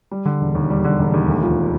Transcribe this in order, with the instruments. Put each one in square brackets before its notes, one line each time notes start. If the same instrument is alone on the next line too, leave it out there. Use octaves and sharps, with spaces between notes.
[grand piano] G3
D3
E1
D#2
G3
D3
E1
D#2
D2
F3